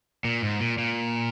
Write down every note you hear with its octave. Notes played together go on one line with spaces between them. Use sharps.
A#2
G#2
A#2
A#2